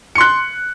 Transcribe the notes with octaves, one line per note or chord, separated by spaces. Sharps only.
C6 F#6 C#7